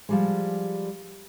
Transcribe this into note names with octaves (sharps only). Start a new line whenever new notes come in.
F3 G3 G#3